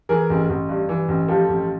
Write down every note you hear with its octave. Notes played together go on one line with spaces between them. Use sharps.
E3 G#4 A#4
A1
A1
G2
E3
A1
F3 G4 A4
A1